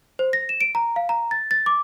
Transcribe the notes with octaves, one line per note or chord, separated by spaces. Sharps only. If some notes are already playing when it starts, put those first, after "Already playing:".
C5
A#6
E7
D7
A#5
F5
A#5
A6
A6
D6